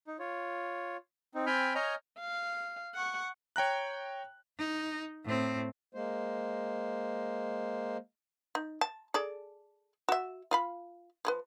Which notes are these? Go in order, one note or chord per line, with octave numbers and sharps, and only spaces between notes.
D#4
F4 C#5
C4 D#4
C4 G5 G#5 B5 F6 G6
C#5 D#5 G#5 A#5 F6 G6
F5
F#5 C#6
C#5 G5 A#5 F#6
D#4
A2 C4
G#3 A#3 C5
D#4
A5
G#4 A4 D5
F#4 E5
F4 F5 B5
F3 G#4 B4